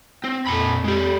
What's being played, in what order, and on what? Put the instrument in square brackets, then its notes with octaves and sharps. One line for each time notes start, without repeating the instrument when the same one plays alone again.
[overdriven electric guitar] C4
[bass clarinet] F2 [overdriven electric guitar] A#2 B5
[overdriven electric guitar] G#3 G4